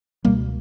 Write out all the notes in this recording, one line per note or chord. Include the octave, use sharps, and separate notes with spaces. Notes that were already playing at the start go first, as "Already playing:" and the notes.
C#2 B2 G3 A#3